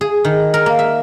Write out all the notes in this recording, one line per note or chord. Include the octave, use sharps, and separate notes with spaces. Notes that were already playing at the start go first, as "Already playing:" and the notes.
G#4
D#3
A#4
A#3
E5